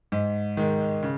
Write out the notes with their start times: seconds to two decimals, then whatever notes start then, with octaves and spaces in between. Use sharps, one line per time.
0.12 G#2
0.57 D#3 G#3
1.03 C#3